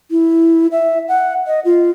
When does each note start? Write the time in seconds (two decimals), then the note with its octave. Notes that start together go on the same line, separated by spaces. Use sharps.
0.11 E4
0.72 E5
1.08 F#5
1.47 D#5
1.65 F4